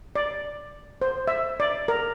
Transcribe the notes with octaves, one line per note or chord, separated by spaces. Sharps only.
D5
C5
E5
D5
A#4